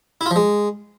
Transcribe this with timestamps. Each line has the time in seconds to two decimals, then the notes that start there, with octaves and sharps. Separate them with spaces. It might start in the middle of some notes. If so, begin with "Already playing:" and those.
0.21 E4
0.26 F4
0.31 F3
0.36 G#3